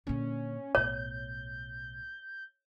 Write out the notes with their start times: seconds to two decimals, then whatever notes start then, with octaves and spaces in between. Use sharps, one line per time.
0.07 A#2 D3 C#4
0.75 B1 A2 C#5 G6